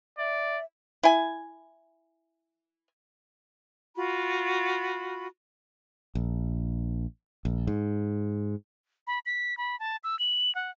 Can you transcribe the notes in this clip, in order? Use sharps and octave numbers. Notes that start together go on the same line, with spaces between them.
D5 E5
E4 G#5
F4 F#4 B5
A#1
A#1
G#2
B5
B6
B5
A5
E6
F#7
F#5